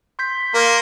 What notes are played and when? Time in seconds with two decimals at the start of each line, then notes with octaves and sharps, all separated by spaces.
0.19 C6 G6 B6
0.54 A#3 A#4 C6